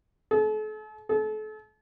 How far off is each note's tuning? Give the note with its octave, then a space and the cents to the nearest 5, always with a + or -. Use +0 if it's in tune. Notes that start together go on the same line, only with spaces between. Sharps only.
A4 -40
A4 -35